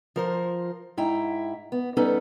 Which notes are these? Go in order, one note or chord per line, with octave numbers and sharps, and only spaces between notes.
F3 A#4 C5
G#2 E4 G5 A#5
B3
G3 B3 C#4 D#4 A4 B4